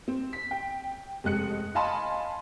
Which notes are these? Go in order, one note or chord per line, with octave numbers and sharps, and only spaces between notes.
C4
B6
G5
F1 G#3 F#6 C#7
D#5 F5 G#5 A5 B5 C6